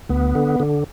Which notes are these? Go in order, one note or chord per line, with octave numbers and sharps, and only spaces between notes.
D2 B3
D3
D3